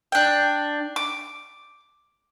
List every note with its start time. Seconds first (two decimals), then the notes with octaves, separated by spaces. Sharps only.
0.12 D4 G5
0.96 D6